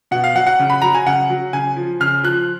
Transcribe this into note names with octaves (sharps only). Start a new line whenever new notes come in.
B2 F#5
F5
F#3 F#5
F#5
C#3
B5
F#3 A#5
G#5
C#3 F#5
F#3
C#3 G#5
F3
C#3 F6
F3 F#6